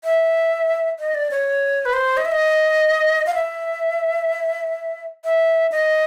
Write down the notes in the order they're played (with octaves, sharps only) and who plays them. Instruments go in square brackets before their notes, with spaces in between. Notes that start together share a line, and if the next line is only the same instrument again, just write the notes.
[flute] E5
D#5
D5
C#5
B4
C5
D#5
E5
D#5
F5
E5
E5
D#5